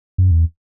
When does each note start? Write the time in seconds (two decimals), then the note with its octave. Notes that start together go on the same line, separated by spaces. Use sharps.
0.18 F#2
0.31 E2